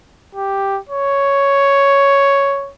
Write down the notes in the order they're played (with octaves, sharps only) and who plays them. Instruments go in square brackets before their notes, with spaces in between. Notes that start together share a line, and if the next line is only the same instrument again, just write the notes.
[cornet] G4
C#5